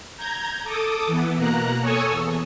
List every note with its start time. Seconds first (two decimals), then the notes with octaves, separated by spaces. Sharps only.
0.17 A#5 G6 G#6
0.63 A4 D6 D#6
1.07 E3 B3
1.37 B2 A#3 A#5 F#6
1.80 A4 C#5 G#5 C#6 D#6 E6
2.10 E2